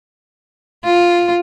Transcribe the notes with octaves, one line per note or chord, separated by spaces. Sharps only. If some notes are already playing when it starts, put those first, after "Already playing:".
F4